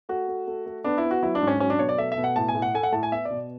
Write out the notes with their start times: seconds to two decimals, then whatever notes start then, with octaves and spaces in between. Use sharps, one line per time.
0.09 A3 F#4
0.28 A3
0.47 A3
0.66 A3
0.84 B3 D4
0.98 E4
1.04 B3
1.11 F#4
1.23 F#3 E4
1.35 D4
1.42 G#2
1.47 C#4
1.60 F#3 C#4
1.70 D4
1.79 B2 C#5
1.89 D5
1.98 A3 E5
2.12 E5
2.18 B2
2.24 F#5
2.36 A2 A5
2.48 G#5
2.55 A2
2.62 F#5
2.74 A3 G#5
2.83 F#5
2.93 A2 A5
3.03 G#5
3.12 B3 E5
3.25 D5
3.31 B2